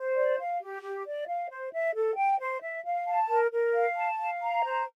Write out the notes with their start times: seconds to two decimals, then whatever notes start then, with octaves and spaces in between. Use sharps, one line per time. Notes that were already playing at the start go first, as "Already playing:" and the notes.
Already playing: C5
0.15 D5
0.38 F5
0.61 G4
0.82 G4
1.05 D5
1.27 F5
1.50 C5
1.72 E5
1.95 A4
2.17 G5
2.40 C5
2.62 E5
2.85 F5
3.06 A5
3.29 A#4
3.52 A#4
3.73 F5
3.97 A5
4.19 F5
4.41 A#5
4.64 C5